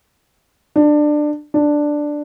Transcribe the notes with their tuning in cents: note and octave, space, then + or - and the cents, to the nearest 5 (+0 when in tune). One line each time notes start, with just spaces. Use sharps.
D4 +20
D4 +5